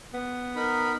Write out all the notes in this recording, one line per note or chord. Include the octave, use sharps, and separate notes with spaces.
B3
D#4 A#4 B5